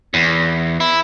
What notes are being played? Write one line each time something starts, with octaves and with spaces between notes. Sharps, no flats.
E2
E4